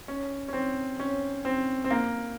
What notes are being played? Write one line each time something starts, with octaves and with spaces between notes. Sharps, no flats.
C#4
C#4
C4
C#4
C4
C4
A#3